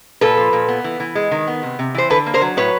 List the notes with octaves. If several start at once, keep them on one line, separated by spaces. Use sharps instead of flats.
A#2 A4 B4
F3
A#2
B3
E3
E3
G#3
D#3
B3
C3
C3
E3 C5
D3 A4 B4
A#3
A#4 C5
F#3
A2 B4 C#5